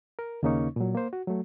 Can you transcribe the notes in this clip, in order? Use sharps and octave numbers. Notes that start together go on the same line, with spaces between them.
A#4
D#2 C#3 A#3 C#4 D#4 C#6
A#2 F#3
A#3 C5
F#4
F#3 A3